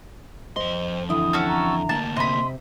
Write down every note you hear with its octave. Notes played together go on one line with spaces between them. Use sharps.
F2 C5 D#5 C6
D3 E3 E4 D#6
C#4 F#4 A4
A#5
D2 A#3 A5
C3 D#5 B5 C6